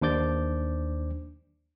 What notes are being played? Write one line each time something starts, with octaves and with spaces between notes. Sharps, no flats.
D#2 D4 C5 D6 G6 A6